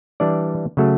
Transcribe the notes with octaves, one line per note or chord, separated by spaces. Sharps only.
E3 G3 D4 D5
C#3 F#3 A3